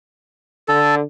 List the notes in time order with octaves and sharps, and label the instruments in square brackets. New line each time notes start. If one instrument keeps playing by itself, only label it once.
[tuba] D3 [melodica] A4